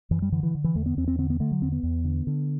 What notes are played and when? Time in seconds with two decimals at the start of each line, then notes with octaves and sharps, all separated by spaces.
0.11 F#2 E3
0.22 G3
0.32 D3 E3
0.43 E3
0.55 D3
0.64 E3
0.75 E2 A3
0.86 B3
0.97 E2 C4
1.08 C4
1.18 D3 C4
1.30 B3
1.40 D3 A3
1.52 F#3
1.62 E2 C4
1.72 B3
1.83 E2
2.04 D3
2.27 D3